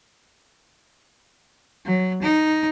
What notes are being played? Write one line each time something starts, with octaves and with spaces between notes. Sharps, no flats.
F#3
D#4